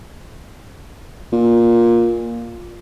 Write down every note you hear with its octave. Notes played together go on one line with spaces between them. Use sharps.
A#2